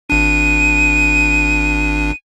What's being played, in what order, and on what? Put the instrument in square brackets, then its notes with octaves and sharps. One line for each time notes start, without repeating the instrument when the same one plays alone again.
[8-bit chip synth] G#1 D4 [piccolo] D#7